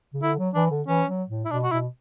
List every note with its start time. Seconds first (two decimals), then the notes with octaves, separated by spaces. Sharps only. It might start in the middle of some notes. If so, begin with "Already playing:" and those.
0.14 C#3
0.22 D3 E4
0.38 F#3
0.54 E3 D4
0.70 D3
0.87 E3 C#4
1.08 F#3
1.29 A2
1.45 E4
1.51 B2 D4
1.63 F#4
1.72 B2 E4